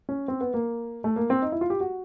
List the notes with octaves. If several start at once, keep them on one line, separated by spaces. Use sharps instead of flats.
C#4
C4
B3
A#3
A3
A#3
C4
D#4
E4
F4
G4
F#4